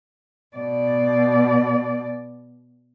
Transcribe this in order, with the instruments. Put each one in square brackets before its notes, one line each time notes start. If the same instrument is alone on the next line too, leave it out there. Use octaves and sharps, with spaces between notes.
[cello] B2 D5